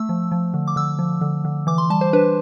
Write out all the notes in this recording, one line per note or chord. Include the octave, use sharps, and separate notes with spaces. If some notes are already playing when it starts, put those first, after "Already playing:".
Already playing: A3 E6
F3
F3
D3
D6
D3 E6
F3
D3
D3
E3 D6
C6
G3 A5
C5
D4 B4